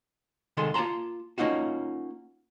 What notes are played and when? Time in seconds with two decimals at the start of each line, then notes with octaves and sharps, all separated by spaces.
0.57 C2 D#3 G#3 G#4 A4 C6
0.74 A#3 F4 A5 A#5 C6
1.38 A#3 C#4 D#4 F4 F#4